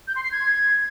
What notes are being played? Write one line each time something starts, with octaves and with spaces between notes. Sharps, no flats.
G6
C6
C7
G#6